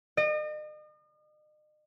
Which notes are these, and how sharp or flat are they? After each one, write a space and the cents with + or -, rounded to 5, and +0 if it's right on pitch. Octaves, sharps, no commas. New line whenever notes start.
D#5 -40